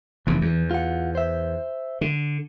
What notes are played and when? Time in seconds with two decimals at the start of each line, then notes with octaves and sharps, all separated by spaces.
0.27 F1 D#2 E3
0.41 E2
0.71 F4 F#5
1.15 C5 E5
2.01 D3